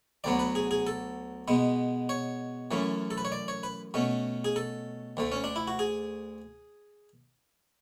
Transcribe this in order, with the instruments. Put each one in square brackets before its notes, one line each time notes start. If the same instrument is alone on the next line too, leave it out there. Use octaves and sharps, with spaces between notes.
[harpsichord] D2 D3 F#3 B3 D5
B4
G#4
G#4
A4
B2 G#3 B3
C#5
F#2 E3 A3 C#4
A4
B4
C#5
D5
C#5
B4
B2 A3 C#4
G#4
A4
D2 D3 A3
C#4
D4
E4
F#4
G#4